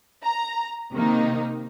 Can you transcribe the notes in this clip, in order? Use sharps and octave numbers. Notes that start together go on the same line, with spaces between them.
A#5
C3 D#3 A#3 D#4